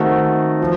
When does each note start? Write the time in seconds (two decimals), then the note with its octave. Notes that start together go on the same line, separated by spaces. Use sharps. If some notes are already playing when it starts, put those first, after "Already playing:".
Already playing: D#3 A3 C4 F#4
0.60 F3